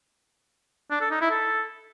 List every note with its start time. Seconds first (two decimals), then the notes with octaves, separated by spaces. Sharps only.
0.91 D4
1.01 A4
1.11 D#4
1.21 E4
1.31 A4